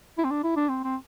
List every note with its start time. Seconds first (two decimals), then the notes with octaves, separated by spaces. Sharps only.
0.18 E4
0.24 C4
0.31 D4
0.44 E4
0.57 D4
0.69 C4
0.84 C4